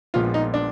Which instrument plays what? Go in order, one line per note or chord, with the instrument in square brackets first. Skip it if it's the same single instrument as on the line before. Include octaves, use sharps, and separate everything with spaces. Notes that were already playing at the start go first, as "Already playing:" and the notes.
[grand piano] A#1 A#2 F3 G#3 B3 [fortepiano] F4
[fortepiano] D#4
D4